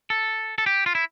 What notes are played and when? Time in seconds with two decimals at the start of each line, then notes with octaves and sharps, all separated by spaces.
0.10 A4
0.58 A4
0.66 G4
0.86 F4
0.95 E4